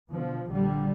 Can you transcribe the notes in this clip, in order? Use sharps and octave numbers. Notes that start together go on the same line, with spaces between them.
B2 D3 F3
A#1 D3 G3